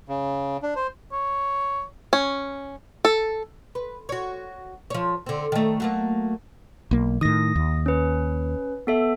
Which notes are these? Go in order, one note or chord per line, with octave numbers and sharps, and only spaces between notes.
C#3
D4
C5
C#5
C#4
A4
B4
F#4 C#5
F3 C#5
D3 C4
D#3 A3
F#3 A3 A#3
B1 A#3
A2 D#3 D#6 A#6
D#2
C#4 B4
B3 A4 E5